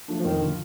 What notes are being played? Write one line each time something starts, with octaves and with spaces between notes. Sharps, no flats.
F3 A3 D4
F3
F2 D#3
D3 F3